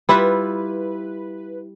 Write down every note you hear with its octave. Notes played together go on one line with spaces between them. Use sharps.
G3 E4 F4 B4